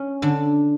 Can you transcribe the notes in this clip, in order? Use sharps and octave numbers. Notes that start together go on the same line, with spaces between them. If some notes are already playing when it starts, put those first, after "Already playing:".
Already playing: C#4
D3 D4